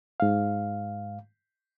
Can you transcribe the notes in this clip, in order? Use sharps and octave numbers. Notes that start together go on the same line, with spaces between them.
G#2 F5